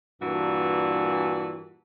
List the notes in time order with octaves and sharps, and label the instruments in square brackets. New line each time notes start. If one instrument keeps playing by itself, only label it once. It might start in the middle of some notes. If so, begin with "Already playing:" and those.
[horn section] G2 A#2 E3 F#4 A5